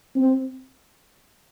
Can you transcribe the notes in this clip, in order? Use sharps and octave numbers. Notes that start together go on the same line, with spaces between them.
C4